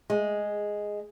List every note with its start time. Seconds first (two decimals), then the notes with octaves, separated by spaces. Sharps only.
0.10 G#3